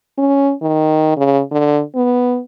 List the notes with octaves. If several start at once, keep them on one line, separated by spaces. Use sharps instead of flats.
C#4
D#3
C#3
D3
B3